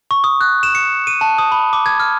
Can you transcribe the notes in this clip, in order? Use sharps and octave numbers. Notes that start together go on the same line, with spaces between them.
C#6
D#6
F#6
E7
C#7
D#7
A5
D#6
B5
D6
G#6
F6